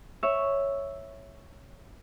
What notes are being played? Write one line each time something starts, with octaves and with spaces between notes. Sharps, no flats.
C#5 E5